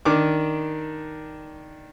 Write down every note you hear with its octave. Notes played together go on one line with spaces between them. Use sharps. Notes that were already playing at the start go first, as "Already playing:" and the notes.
D#3 D4 D6